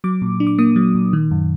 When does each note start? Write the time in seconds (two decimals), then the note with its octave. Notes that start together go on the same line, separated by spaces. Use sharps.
0.04 F#3 D6
0.22 A#2
0.40 D4
0.47 D6
0.58 A#3 D#6
0.76 F#3
0.95 A#2
1.13 D#3
1.31 F#2